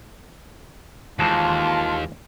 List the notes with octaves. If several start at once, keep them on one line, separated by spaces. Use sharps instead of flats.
D#2 E3 G#3 F4 C5 A5 C6